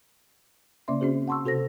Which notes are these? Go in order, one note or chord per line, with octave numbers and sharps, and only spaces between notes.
C#3 A#3 C#4 D5 E5 C6
C4 C#4 F#4 G#4 C5
F#5 A5 C6 C#6 E6
C3 F#4 A4 C5 A#6